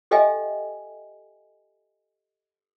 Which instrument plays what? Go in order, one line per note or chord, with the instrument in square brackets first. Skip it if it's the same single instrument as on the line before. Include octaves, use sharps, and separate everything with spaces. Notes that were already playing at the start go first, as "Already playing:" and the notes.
[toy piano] G4 A4 D#5 E5 G5 G#5